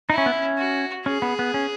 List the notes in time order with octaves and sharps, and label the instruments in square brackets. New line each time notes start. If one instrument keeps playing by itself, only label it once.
[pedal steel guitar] D#4 [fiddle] E4
[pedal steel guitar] C#4
B3
C#4
[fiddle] F#4
[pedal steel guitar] C#4 [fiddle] G#4
[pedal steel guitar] B3
B3
C#4